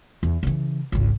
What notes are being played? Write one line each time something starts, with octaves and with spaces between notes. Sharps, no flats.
E2
C#3 E3
G#1 C#2